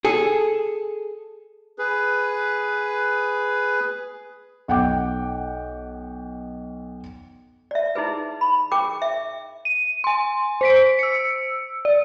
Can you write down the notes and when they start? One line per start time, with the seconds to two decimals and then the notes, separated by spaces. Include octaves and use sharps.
0.05 G#4 A4
1.78 G#4 B4
4.68 B1 F#5 G5 D6
7.71 D5 E5
7.95 D#4 E4 G#4 B4
8.41 B5
8.72 G#4 A#4 G5 C#6 D6
9.02 E5
9.65 D#7
10.04 G#5 C6
10.61 C5 B6 D7
10.99 E6 C#7
11.85 D5